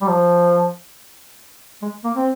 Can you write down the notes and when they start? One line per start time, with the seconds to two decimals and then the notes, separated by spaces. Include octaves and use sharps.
0.02 G3
0.08 F3
1.82 G#3
2.04 A#3
2.16 C4